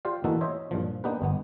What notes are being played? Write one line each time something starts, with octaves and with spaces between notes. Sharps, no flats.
F4 G4 C5 D5 F5
E3 A3 A#3 D#4 F#4 A4
C5 C#5 D#5 E5
G2 A#2 F3
A#3 B3 D4 D#4 G4 B4
G1 B3